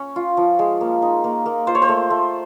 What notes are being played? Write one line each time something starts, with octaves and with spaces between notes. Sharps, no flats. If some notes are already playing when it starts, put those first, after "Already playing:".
Already playing: C#4
F4
F3
G#3
A#3
D#4
A#3
A#3
F4 C5
C#5
C5
A3
A3